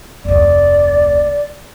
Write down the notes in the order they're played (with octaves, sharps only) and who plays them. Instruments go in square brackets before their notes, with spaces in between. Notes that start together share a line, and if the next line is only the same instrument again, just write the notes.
[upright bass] F1 D2 [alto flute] D5